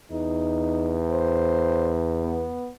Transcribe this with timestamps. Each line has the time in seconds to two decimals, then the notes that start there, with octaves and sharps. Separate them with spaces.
0.11 E2 D#4
1.11 C5
2.22 B3